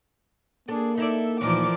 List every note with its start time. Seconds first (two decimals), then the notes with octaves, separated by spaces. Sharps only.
0.68 A#3 D4 G#4 A4
0.98 D#4 E4 A4 D5 E5
1.41 D#2 A#2 E3 F3 D#4 A#4 D5 D6